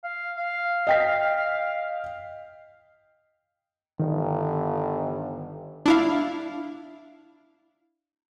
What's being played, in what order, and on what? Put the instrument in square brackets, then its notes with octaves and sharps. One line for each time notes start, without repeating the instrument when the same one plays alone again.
[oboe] F5
F5
[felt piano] D#5 G5 B6
[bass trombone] G1 [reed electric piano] D#3
[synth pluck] D4 E4 F5